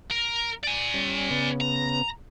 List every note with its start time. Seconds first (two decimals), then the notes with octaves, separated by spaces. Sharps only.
0.11 A#4
0.63 D5 G#5
0.94 G3 C#4
1.31 C#3 B3
1.61 A#5